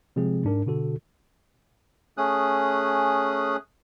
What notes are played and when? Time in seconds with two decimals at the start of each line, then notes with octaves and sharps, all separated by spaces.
0.16 C3 F3 G#3 C4 G#4
0.44 G#2 D4 A#4
0.66 B2 D3 F#4 A4
2.18 A3 C#4 G#4 D#6 F#6